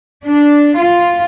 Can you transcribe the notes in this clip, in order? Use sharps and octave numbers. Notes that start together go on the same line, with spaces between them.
D4
F4